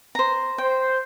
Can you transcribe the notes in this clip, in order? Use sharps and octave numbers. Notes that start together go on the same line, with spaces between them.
C5 A#5
C5 G5